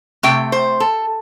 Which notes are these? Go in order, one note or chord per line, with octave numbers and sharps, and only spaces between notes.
C3 A3 G5
C5
A4